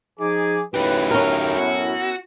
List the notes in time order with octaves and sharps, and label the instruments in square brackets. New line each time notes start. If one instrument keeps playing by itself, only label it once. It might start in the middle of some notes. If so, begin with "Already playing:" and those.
[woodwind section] F3 D6 [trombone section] D#4 G#4
[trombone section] F#2 A2 [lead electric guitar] D#4 G4 [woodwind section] B4
[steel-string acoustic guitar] C#4 A#4
[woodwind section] B3 E4 [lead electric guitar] F#4